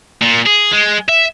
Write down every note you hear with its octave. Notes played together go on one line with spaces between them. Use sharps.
A#2
G#4
G#3
E5